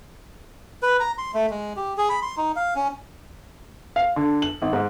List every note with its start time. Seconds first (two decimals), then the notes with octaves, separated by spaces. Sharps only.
0.83 B4
1.00 A#5
1.18 C6
1.34 A3
1.50 G#3
1.77 G4
1.98 G#4
2.09 B5
2.22 C6
2.37 D#4
2.56 F5
2.76 C#4
3.96 F5
4.16 D3
4.42 F#7
4.62 G#1
4.73 G#2